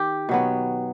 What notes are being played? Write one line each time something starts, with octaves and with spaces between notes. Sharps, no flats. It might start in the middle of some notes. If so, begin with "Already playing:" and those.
Already playing: D#3 G4
B2 F#3 B3